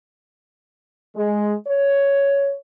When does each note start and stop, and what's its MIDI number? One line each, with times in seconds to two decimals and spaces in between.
1.16 1.53 56
1.67 2.54 73